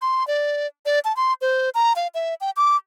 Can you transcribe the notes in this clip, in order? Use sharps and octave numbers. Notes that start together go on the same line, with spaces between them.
C6
D5
D5
A5
C6
C5
A#5
F5
E5
G5
D6